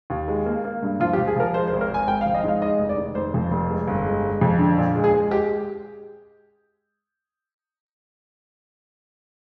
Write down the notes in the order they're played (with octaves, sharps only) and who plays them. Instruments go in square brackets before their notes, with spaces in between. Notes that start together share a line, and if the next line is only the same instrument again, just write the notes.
[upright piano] D#2
G#3
A#3
A#3
G2
F3 F4
G4
F3
G#4
F3 A#4
G#3 C5
C5
G#1
A#4
G#1 G#5
G#1 G5
F5
F3
D#5
G#2 F5
G#3 D#5
F1
D5
D#3
F1 C5
F2
F1
G#3
G1
G#3
G#3
F2
D3
A#2
G#3
G#4
G#3
G#3 G4